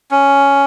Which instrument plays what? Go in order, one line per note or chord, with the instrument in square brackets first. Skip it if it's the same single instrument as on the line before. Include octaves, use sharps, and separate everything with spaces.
[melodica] C#4